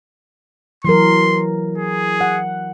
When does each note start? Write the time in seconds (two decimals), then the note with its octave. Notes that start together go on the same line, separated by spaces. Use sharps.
0.84 E3 F#3 A#4 C6
1.78 G#4
2.21 F#5